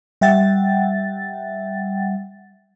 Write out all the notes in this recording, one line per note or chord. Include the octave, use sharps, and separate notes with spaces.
G3 E5 F#5 G5 A6